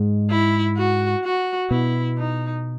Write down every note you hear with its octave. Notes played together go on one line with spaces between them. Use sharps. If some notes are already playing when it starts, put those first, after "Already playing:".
Already playing: G#2 G#3
E4
F#4
F#4
B2 B3 E4
D#4